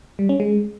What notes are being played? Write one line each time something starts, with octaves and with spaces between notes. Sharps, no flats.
G3
C#4
G#3